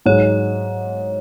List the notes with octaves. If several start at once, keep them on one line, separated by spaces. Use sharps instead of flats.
G#2 F#3 D#4 G#4 C#5